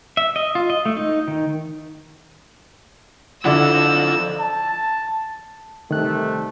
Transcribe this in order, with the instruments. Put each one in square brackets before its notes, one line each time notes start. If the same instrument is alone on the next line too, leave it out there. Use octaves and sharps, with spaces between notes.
[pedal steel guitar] E5
D#5
F4
D#5
A3
D#4
D#3
[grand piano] D3 E4 [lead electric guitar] F3 A4 [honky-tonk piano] D5 F#5 [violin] E6
[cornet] A5
[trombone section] C3 G3 A3 [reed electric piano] D#3 F#6